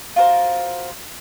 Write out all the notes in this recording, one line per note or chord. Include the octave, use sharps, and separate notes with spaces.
F4 F#4 A#4 C5